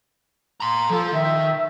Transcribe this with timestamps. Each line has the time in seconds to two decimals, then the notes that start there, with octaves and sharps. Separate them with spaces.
0.60 A#5 C6
0.90 F3 F4 A4
1.13 D#3 E5